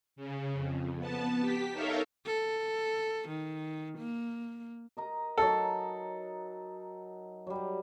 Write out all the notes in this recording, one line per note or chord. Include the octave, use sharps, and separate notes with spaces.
C#3
F2
B3 A5
G4 B6
D#4 A4 A#4 C#5 E5 F5
A4
D#3
A#3
A#4 D#5 A#5
F#3 D#4 A4
F#3 G3